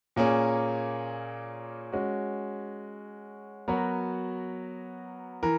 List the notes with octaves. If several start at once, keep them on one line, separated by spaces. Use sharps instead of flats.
A#2 A#3 C#4 G#4
G#3 C#4 F#4
F#3 B3 F#4 A#4 C#5
E3 A#4